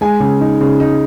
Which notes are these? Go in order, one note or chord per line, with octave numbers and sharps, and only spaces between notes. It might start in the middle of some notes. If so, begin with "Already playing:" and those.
G#3 G#5
C#3
D#4
C#3
D#4